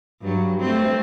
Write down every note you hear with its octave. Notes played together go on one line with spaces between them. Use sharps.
G2 F#3
A3 C4